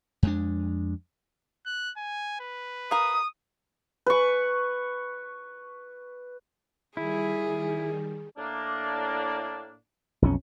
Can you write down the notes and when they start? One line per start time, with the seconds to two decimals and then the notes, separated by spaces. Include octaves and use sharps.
0.23 F2 G#3 D4
1.66 F#6
1.97 G#5
2.40 B4
2.91 A#4 F5 D#6
4.06 B4 C#6
6.97 D#3 G3 E4 G#4
8.38 A2 A#3 D4
10.22 B1 F2 C#4